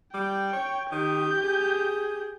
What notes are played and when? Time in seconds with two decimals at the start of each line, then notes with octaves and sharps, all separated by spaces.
0.14 G3 G5
0.53 C#5
0.92 D#3 G4 G6
1.43 G#4